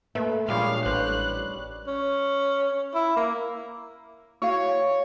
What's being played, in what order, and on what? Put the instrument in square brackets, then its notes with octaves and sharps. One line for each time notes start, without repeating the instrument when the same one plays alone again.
[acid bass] A3 [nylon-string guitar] A#3 B4 E5
[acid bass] A#2 [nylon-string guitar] F3 G#3 G#4 [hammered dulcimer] G3 D4 C#5 [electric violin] F5
[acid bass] A1 [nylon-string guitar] B4 C5 [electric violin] F#6
[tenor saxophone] C#4
E4
A#3
[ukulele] E4 F#4 F5 [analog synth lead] C#5